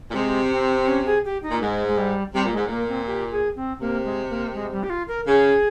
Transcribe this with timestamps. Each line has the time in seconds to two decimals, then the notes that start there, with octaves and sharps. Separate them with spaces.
0.10 A#2
0.14 C3 G#3
0.51 C4
0.76 C4
0.88 C#4
1.06 G#4
1.25 G4
1.43 D#4
1.51 A#2
1.61 G#2 G#3
1.88 G#3
1.97 G3
2.34 C3 G3
2.45 A#2
2.52 G#2 G#3
2.66 A#2 A#3
2.88 C4
3.07 G4
3.31 G#4
3.56 C4
3.80 C3 A#3
4.05 G#3
4.30 A#3
4.54 G#3
4.72 G3
4.83 G4
4.90 F4
5.08 A#4
5.27 C#3 G#4